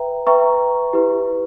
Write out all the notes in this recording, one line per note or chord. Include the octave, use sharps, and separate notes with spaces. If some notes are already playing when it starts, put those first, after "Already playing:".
Already playing: B4 E5 G5 A#5
B4 E5 G5 A#5 C#6
E4 G4 B4